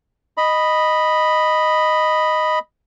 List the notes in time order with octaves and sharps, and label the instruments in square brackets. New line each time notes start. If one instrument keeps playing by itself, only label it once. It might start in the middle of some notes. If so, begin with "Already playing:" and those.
[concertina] D#5 B5